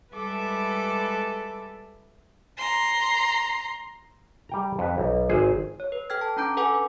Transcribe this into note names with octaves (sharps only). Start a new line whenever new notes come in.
G3 G#3 A4 B4 E5 D6
A#5 C6
G3 G5 A#5
F2 B4
B1
G#1 G#4 C5
C#5
B4
A4 G5 F6 G#6
A5
C#4 D4 A#5 D6 G6 D7
A4 B4 F#5 G#5 D6